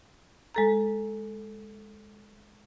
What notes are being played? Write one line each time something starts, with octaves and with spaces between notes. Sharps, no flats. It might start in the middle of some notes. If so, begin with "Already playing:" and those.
G#3 A4 A#5